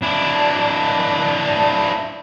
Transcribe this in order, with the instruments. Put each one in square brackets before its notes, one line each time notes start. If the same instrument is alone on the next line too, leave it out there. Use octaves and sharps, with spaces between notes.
[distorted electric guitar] D4 E4